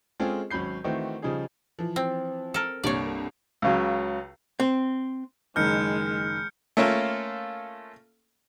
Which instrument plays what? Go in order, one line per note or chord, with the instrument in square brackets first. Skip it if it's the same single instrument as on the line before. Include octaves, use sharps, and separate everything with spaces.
[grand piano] G#3 C4 C#4 F4 G#4 A4
G#1 F#3 C#4 B5 G6 C7
D#3 E3 A3 C4 F#4
C#3 F3 G3 D#4 G#4
[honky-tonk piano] E3 F3
[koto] C4
A4 A#4
[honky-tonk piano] C2 G2 A#3 [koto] C#5 D5
[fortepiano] C#2 C#3 F#3
[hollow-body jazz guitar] C4
[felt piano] F#1 D#3 [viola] G#3 [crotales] F6 G6 C#7
[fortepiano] A3 A#3 C#4 F4 A4